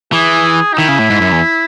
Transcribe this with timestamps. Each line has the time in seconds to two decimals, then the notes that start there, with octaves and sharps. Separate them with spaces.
0.13 E3 G#4
0.73 D#4
0.78 D#3 E4
0.88 C#3
0.99 A2
1.10 G#2
1.21 F#2
1.32 E2